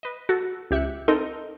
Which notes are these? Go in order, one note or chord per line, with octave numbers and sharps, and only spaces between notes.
B4 D#5
F#4 A4
C#2 G4 E5 F#6 C#7
C4 D#4 A4 A#4 D#5